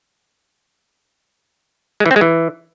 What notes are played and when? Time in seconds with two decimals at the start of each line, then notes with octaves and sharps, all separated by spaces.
2.00 G#3
2.06 E3
2.11 C4
2.16 G#3
2.21 E3